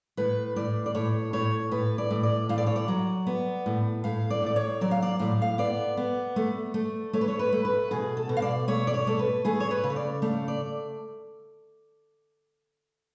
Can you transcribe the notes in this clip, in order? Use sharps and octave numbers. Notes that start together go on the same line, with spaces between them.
A2 B4
A2 D5
D5
A2 C#5
A2 C#5
A2 B4
D5
A2
D5
A2 F5
D5
C#5
D5
F#3
B3
A2
A2 F5
D5
A2 D5
C#5
F#3 D5
F5
D5
A2 F5
F5
B3 D5
B3
A3
A3
A3 C#5
B4
C#5
B4
A3
B4
B2 G#4
A4
B2
F5
D5
A3 C#5
D5
C#5
A3 A4
B4
A3 G#4
C#5
B4
C#3
C#5
D5
A3 F5
D5